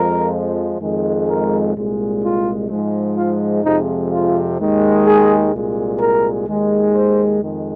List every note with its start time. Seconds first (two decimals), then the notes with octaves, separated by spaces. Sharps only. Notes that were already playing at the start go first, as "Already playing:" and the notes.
Already playing: F2 F3 G#3 A#4
0.81 F2 D#3 G#3
1.28 A#4
1.75 C2 A#2 G#3
2.22 F4
2.70 G#2 F3 G#3
3.17 F4
3.64 F2 C3 F3 G#3 D#4
4.11 F4
4.58 D#2 D#3 G#3
5.06 G#4
5.53 C2 A#2 G#3
6.00 A#4
6.47 D#2 D#3 G#3
6.94 C5
7.42 F2 D#3 G#3